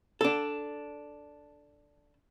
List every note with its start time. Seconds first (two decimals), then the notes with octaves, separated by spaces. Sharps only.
0.21 D4 A4